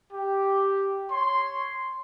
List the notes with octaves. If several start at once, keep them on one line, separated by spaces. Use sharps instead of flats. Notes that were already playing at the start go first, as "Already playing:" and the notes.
G4
C#5 C6